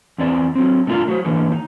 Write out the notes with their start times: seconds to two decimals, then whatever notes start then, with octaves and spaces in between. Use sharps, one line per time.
0.18 E2 C4 D5
0.55 F#3 C4
0.87 D3 A3 F4 A#4
1.08 F#3 F#4 C5
1.25 D3 E3 A#3
1.52 D#4